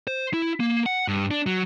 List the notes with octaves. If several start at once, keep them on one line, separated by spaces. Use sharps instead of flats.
C5
E4
A#3
F#5
G2
D4
F#3